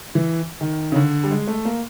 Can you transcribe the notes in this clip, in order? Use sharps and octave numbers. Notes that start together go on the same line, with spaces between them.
E3
D#3
C#3
D3
G3
G#3
A3
A#3